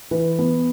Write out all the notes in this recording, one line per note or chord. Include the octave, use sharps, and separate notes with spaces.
E3 B4
B3